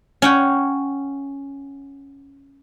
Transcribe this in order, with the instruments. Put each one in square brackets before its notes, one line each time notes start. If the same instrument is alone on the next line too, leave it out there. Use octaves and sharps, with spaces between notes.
[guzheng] C#4 F#5 G5